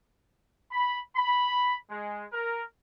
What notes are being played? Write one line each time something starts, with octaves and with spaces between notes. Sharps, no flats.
B5
B5
G#3
A#4